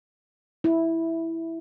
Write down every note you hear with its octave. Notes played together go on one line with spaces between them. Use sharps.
E4